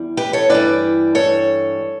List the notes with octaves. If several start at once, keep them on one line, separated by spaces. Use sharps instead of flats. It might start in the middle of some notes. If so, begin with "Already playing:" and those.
Already playing: E2 G3
G4 B4
A4 C#5
G2 E3 G3 B4 D5
A4 C#5